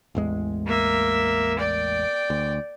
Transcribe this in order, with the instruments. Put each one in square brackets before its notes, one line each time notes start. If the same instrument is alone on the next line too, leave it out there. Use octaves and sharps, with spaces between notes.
[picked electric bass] A1 E2 G#3
[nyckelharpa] A#3 E5
D5 G5
[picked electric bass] D2